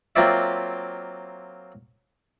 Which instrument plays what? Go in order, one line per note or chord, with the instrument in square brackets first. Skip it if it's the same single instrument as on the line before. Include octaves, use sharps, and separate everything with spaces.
[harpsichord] F#3 A#3 C4 F4 D5 E5